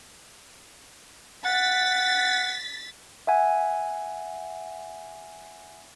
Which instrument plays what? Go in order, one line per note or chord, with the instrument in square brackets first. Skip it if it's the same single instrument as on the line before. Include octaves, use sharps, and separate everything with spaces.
[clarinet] F#5 [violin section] A6 B6
[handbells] E5 F#5 G#5